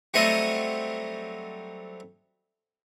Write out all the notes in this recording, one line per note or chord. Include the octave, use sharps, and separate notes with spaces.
F#3 G3 A3 C4 D#5